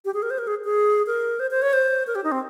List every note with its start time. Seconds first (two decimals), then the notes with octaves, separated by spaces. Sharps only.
0.05 G4
0.14 G#4
0.22 A#4
0.30 C5
0.38 A#4
0.47 G#4
0.65 G#4
1.07 A#4
1.40 C5
1.51 C5
1.62 C#5
1.73 C5
2.07 A#4
2.15 G4
2.24 D#4
2.32 C4